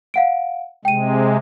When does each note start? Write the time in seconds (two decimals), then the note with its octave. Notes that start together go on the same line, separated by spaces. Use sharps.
0.14 F5 F#5 D7
0.85 C3 G#3 G5 D#7